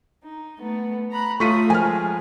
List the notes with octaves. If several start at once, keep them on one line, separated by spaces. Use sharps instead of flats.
D#4
A3 B3
A#5 B5 F#6
A3 F4 A4 C#5 C#6 D#6 B6 D#7
F3 G#3 A#4 G#5 F6